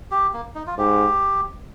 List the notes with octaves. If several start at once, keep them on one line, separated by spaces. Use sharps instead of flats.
G4
A#3
D#4
F4
G#2 G4